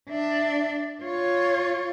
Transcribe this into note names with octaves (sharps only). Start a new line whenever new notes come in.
D4 E5
F4 C#5